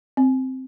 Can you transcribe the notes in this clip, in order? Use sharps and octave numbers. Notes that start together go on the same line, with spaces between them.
C4